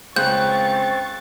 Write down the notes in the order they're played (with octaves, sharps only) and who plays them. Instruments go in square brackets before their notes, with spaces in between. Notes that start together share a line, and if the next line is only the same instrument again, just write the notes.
[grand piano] C#2 C#3 F#6 [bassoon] C4 [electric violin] C#6 A6 [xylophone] G6